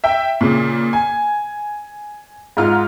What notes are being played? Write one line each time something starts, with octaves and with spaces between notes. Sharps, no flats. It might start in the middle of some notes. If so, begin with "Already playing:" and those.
E5 G5
A#2 C#3
G#5
G#2 G#3 F4 F6